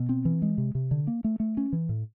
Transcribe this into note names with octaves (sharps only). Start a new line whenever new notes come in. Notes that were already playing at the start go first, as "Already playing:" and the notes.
Already playing: B2
C4
E3
G#3
C3
C3
D3
A#3
A3
A3
C#4
E3
A2